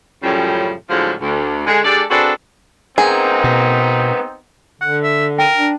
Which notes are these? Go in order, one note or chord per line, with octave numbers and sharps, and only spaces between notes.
F#2 A2 C#3 F3 G3
A2 D3 F3 F#3 G#3 F4
D2
D3 G#3 G#4
G#3 D4 G4 A4 D5
C4 D4 F#4 G#4 A4 B4
B3 C4 D#4 G#4 A#4
B2
D3 F#5
E5
A#4 G5 D#7
D4